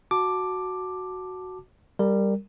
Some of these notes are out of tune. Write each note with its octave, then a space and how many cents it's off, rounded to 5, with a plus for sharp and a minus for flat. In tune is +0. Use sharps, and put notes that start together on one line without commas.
F#4 +0 A5 +0 D6 +5
G3 +10 A#4 -20